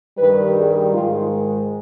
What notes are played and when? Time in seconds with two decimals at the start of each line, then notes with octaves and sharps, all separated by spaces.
0.18 G2 D#3 G3 B4
0.56 G#4
0.93 G#2 D#3 G#3 F4